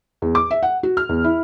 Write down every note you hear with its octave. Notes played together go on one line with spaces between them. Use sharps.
E2
D6
E5
F#5
F#4
F6
E2
E4